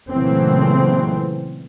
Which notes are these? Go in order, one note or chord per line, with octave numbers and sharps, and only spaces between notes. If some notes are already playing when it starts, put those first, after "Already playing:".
A#2 C#3 E3 F#3 A3 C4